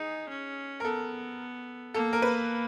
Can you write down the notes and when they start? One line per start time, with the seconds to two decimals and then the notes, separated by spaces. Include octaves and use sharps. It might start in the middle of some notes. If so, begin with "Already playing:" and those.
Already playing: D#4 G#4
0.29 C#4
0.80 A#4
0.84 B3 A4
1.94 A#3 A4
2.13 A#4
2.22 B4